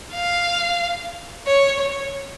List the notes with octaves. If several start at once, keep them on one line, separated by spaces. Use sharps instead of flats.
F5
C#5
C#5